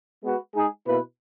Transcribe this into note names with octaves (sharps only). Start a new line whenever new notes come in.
G#3 B3 F#4 B4
G#3 D#4 G#4
B2 A#3 E4 B4